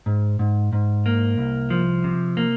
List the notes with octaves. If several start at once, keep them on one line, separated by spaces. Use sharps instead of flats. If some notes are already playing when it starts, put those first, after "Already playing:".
G#2
G#2
G#2
A#3
C2
F3
C3
A#3